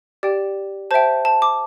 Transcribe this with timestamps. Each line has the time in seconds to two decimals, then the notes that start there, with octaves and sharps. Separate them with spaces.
0.23 G4 D5 G5
0.91 C5 E5 G5 A5
1.25 A5
1.42 D6